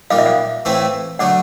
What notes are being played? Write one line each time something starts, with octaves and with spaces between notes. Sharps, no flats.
A#2 G3 A#3 D#4 F5
E5
F5
A2 E3 A3 C4 E4
D3 F#3 A3 D4 F#5